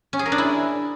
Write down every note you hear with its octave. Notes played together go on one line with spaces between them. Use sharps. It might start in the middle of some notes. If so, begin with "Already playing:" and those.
C#4
G#4
A#4
D4
E4